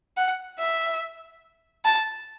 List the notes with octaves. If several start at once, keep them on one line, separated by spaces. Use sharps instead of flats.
F#5
E5
A5